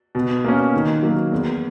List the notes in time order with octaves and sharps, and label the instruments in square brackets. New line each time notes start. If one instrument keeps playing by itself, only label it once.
[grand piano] B2
A#3 C#4
D#3
F#3 A#3
E2